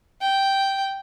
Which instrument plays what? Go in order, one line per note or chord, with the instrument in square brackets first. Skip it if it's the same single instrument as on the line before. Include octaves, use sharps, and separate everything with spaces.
[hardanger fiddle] G5